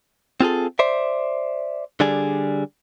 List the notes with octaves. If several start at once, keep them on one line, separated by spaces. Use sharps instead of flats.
C4 F4 G#4 A4
C5 D5 E5
D3 G3 D4 G#4